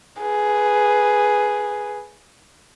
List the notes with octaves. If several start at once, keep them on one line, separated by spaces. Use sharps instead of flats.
G#4 B4